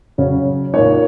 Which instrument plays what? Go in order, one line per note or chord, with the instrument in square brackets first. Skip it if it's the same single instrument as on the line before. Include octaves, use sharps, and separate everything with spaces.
[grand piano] C#3 F#3 C#4
A#2 A#3 D#4 C#5